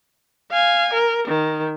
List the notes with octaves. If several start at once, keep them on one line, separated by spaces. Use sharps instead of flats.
F5 G#5
A#4
D#3